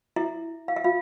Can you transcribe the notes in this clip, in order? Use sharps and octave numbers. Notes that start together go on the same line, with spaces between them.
E4 E5
F5
E5
F4 F5